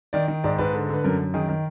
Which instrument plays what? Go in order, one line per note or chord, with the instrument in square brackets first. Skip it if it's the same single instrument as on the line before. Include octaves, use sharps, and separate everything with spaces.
[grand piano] D#3 D5
D#3
G#2 D5
G#2 B4
D3
D3 B4
F#2 A#4
F#2
D#3 G#4
D#3